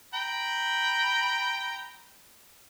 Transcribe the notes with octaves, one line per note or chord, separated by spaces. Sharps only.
G5 A#5 B5